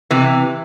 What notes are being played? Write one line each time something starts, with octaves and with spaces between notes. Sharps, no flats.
C3 E3